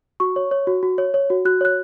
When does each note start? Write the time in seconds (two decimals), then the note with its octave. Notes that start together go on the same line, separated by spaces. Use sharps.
0.20 F#4 C#6
0.36 C#5
0.51 C#5
0.67 F#4
0.83 F#4
0.98 C#5
1.14 C#5
1.30 F#4
1.45 F#4 F#6
1.61 C#5 F#6